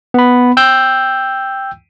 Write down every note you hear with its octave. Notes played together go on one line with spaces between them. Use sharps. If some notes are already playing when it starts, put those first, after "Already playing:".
B3 B5
G5 E6 G6